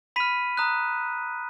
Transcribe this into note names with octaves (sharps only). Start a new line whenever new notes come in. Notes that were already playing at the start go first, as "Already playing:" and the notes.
B5 F6 B6 D#7
A#5 D#6 F#6